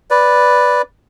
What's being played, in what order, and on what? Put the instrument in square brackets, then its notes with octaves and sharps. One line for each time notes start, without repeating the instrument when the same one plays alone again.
[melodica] B4 D5